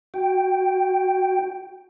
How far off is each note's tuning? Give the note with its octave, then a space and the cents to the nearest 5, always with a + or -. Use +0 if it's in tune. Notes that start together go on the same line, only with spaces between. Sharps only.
F#4 +0 G5 +0